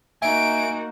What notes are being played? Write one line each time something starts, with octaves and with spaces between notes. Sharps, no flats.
A#3 D#4 F#4 E5 G#5 D7